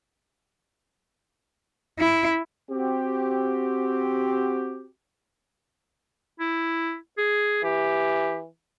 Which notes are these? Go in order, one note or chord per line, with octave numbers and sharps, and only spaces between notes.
E4
C4 F#4 G4
E4
G#4
E3 G4